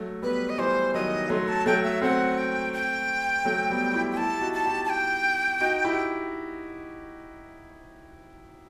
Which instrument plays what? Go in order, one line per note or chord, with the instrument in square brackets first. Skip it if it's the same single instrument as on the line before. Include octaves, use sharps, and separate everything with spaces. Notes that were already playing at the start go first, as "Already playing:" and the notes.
Already playing: [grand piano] F#3 A3
[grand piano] G3 B3 [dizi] B4
[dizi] D#5
[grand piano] E3 G3 [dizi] C5
[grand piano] D#3 F#3 [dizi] D#5
[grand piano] F#3 A3 [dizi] C6
[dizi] A5
[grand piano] F#3 A3 [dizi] G5
[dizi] E5
[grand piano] A3 C4 [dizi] F#5
[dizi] G5
G5
[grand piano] F#3 A3
G3 B3
E4 G4
[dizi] G5
[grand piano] E4 G4 [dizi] A5
[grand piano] G4
D#4 F#4
[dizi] A5
[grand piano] E4 G4
[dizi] A5
G5
[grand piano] D#4 F#4
E4 G4